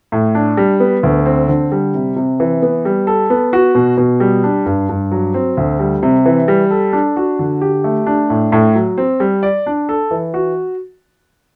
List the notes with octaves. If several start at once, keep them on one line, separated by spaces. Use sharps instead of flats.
A2
D4
G3
B3
D2
C4
D3
G3
C3
C3
E3
B3
G3
A4
B3
F#4
B2
B2
G3
D4
G2
G2
F#3
C4
D2
G3
C3
E3
G3
A4
D4
F#4
D3
G4
A3
D4
A2
A2
F#3
C4
G3
D5
D4
A4
E3
F#4